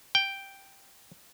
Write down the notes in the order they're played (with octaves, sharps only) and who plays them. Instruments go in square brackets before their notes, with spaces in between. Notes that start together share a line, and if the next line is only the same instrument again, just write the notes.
[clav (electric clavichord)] G5